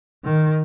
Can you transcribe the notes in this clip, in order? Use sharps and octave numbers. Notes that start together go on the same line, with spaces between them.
D#3